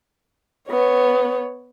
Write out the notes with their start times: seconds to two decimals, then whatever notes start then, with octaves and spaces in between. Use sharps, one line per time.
0.69 B3 C#5